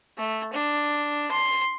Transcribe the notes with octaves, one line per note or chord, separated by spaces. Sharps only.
A3
D4
C6